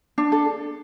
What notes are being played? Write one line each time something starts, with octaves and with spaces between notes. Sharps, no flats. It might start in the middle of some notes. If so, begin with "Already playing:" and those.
D4
A4